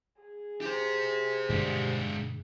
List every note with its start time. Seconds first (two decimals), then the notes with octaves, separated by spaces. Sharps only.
0.22 G#4
0.61 G4 C5
1.50 G2 B2 D3 G#3 D4